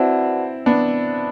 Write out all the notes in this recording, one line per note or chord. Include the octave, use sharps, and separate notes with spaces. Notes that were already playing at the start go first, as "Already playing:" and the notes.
Already playing: C4 E4 F#4 B4 D5 F#5 A5
B3 D4